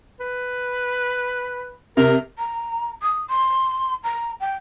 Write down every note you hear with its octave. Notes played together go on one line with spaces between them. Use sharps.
B4
C3 A#4
A#5
D#6
C6
A#5
G5